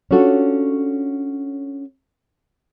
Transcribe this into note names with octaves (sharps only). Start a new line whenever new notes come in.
C#4 D4 F4 F#4 A4 C#5